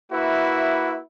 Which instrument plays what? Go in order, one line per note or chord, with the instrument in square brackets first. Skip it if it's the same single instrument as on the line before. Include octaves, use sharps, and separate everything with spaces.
[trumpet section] A#3 E4 F#4 B4 E5